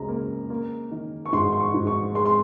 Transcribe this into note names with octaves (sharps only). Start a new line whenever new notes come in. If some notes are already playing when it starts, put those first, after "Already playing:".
Already playing: C#2 C#3 A#5
A#3
A#3
D#3
C#6
G#2 C6
C6
C#6
G#2
C#6
G#3 C6
C6